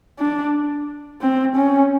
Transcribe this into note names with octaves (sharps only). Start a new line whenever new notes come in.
D4
C4
C#4